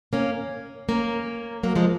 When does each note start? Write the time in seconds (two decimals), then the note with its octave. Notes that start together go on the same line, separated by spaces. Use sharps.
0.13 A#3 C#4
0.89 A#3 C#4
1.64 F#3 A#3
1.75 F3 G#3